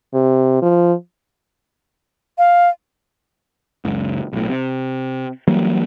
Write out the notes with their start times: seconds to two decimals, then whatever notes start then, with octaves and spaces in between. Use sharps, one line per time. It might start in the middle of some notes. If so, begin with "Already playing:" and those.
0.14 C3
0.62 F3
2.38 F5
3.85 F#1 C#2
4.33 B1 A2
4.49 C3
5.48 E3 F#3 G3 A#3